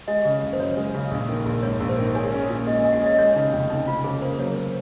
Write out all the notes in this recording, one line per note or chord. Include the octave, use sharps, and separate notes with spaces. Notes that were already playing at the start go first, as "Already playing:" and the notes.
G#3 D#5
C#3
F#1
C5
F#2 C#5
G#3
C#3
A#1
D#3
A#1
G#2 C#5
A#1
C5
D#3
G#4 C#5
C#4
A#2
G#3 D#5
D#5
G#4
F#5
C#4 D#5
G#3 C#5
C#3 D#4
F1 C#4
F2 D#4
G#3 F4
C#3 G#4
A#3 C5
F#3 C#5
C5